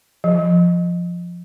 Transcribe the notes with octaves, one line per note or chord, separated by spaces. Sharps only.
F3